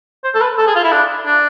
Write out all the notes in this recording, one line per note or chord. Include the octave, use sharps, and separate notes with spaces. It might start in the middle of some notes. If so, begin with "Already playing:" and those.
C5
A4
B4
A4
G#4
F4
E4
D4
D4